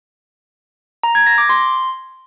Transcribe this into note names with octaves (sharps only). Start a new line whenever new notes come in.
A#5
G#6
A#6
D6
C6